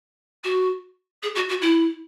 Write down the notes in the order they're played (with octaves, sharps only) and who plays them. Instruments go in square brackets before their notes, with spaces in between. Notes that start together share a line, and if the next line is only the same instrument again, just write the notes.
[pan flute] F#4
G#4
F#4
F#4
E4